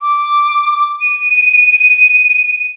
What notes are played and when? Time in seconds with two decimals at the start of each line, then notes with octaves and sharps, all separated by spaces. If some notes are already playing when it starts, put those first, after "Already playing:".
0.02 D6
1.01 D#7